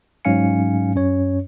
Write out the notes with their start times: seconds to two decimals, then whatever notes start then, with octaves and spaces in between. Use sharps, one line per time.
0.25 G#2 F#3 C#4 F5 G#5 C#7
0.95 F#2 C#4 C#5